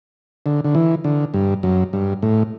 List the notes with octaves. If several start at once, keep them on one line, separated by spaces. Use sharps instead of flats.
D3
D3
E3
D3
G2
F#2
G2
A2